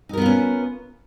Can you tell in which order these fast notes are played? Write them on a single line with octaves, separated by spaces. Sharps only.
D#4 A#4 B3 F4 C#4